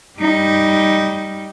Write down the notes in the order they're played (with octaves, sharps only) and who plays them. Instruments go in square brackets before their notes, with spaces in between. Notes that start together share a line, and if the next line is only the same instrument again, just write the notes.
[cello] G3 D#4